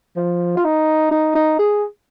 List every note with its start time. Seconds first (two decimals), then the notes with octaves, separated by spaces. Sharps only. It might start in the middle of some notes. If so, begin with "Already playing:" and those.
0.16 F3
0.57 F4
0.64 D#4
1.11 D#4
1.35 D#4
1.59 G#4